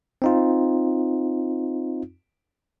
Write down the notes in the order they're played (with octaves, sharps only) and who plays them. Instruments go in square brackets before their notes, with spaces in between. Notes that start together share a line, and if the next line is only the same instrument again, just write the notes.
[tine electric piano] C4 D#4 F4